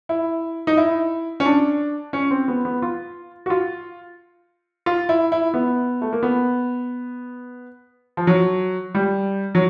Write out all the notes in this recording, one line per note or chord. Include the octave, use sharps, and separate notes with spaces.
E4
D#4
E4
C#4
D4
C#4
C4
B3
B3
F4
F#4
F4
F4
E4
E4
B3
A3
A#3
B3
F3
F#3
G3
F#3